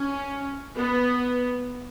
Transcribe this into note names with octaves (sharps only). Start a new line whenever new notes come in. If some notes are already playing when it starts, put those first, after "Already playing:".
Already playing: C#4
B3